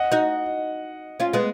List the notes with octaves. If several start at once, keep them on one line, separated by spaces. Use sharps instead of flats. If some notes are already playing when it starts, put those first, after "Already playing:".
Already playing: D#5 F#5
D#4 F#4
C#4 F4
G#3 B3